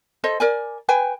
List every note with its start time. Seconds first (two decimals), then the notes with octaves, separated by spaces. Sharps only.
0.24 A4 C5 D#5
0.40 A#4 D5 G#5
0.89 B4 G5 G#5